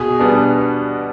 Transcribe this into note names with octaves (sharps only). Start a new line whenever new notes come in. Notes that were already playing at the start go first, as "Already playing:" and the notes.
Already playing: B2 G#4
G3 B3 D4